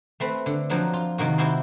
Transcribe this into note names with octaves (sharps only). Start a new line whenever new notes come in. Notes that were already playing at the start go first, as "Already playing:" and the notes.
A3 C4 B4
D3
F3 F#3 A#3 C4 D4
F4
C3 D#3 A#3 F#4
G#3 C4 E4 F#4 G4